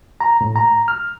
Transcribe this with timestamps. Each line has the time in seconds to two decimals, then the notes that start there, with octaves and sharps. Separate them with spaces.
0.21 A#5
0.41 A2
0.56 A#5
0.88 F6